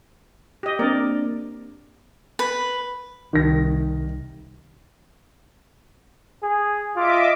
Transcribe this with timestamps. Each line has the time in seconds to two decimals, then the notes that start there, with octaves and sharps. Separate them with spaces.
0.63 G4 D#5
0.79 A#3 C4 D4 A#4 D5
2.39 B4
3.33 C2 D#3 A#6
6.43 G#4
6.96 F4 D#5 E5 D6